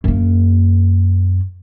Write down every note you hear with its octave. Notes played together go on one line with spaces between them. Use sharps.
F#2 A#3